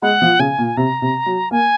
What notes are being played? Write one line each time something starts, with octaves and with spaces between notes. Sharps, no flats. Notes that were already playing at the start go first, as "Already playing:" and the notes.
G#3 F#5
F3
C#3 G#5
A#2
C3 A#5
C3
F#3
A#3 G#5